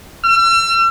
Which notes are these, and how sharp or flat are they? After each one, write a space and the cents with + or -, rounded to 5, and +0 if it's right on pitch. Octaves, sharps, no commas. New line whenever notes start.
E6 +45